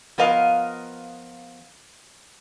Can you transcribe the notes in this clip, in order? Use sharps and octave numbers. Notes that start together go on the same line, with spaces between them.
F3 B3 A#4 D#5 F5